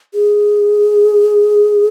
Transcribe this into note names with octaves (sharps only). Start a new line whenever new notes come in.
G#4